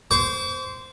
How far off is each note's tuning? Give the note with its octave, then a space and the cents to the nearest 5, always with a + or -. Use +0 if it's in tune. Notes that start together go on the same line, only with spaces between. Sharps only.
C5 -10 D6 -45